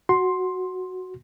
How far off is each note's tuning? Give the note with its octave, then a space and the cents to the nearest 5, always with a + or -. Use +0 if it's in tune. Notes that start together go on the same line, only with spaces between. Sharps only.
F#4 +0 C6 +10